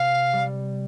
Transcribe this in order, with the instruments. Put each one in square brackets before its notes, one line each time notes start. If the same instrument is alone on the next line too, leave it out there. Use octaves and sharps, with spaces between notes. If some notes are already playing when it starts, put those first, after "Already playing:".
Already playing: [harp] C3 [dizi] F5
[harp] G3